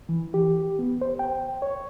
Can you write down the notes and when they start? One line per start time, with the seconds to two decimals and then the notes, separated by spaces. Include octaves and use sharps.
0.09 E3
0.34 G4
0.79 B3
1.01 C5
1.19 G5
1.62 C#5